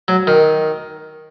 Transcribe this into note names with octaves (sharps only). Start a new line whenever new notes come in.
F#3
D#3